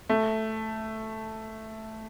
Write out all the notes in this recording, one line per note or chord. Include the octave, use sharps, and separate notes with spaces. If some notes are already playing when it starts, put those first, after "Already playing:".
A3